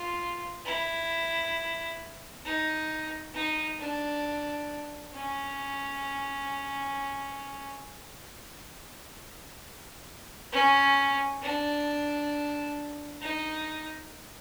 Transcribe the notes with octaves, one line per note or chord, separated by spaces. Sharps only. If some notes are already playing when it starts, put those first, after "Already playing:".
Already playing: F4
E4
D#4
D#4
D4
C#4
C#4
D4
D#4